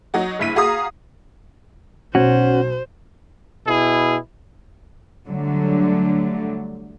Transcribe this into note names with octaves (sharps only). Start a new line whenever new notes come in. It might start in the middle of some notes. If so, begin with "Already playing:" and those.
F#3 D#4 F#4
F#1 G2 E4 B6 D#7
F#4 G#4 F5 A#5 D#6
B1 C#4 F#4 C5
B2 E4 G#4
D3 F#3 G3 A3